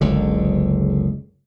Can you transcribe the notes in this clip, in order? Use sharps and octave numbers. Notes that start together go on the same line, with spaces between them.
F#1 C#2 D3